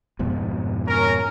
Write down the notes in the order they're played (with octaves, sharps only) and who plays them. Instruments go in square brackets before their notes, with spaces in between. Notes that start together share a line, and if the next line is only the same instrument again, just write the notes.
[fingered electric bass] F2 G#2 B2
[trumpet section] C#4 A#4